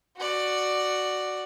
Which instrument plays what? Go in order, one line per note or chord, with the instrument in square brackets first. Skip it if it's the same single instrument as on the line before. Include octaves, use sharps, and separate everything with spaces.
[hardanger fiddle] F#4 D5